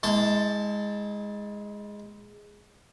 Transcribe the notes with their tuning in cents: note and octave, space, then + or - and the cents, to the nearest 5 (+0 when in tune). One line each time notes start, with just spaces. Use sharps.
G#3 -5 E4 -45 A5 +10